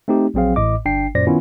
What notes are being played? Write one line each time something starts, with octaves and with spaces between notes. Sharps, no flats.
A3 C4 D#4 G4
A#1 F#3 C4 G#4 F5
A1 A2 D#5 D6
G1 D4 G5 C7
F#2 A#2 C5 D5 A#6
D#3 B3 C#4 E4 F4